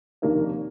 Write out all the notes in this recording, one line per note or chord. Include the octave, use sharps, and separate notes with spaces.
F1 D#2 D#3 A#3 D4